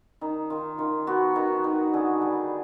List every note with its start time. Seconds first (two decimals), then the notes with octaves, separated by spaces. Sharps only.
0.21 D#3 D#4
0.50 D#3 F4
0.78 D#3 F4
1.07 B3 F#4
1.36 D#3
1.64 D#3
1.93 D3 G#4
2.22 G3